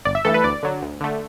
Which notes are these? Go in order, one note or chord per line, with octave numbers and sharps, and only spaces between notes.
G1 D5
E5
G2 E3 A3 A4
B4
D2 D5
D3 F#3
D2
D3 A3